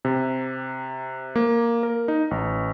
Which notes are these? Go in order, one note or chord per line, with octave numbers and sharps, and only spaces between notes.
C3
A#3
A#4
D#4
A1